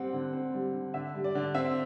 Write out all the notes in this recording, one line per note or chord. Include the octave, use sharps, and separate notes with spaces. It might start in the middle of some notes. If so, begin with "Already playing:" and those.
Already playing: G3 C4 F#5
D3
C4
G3
D3
D3 E5
G3
D5
D3
C4 E5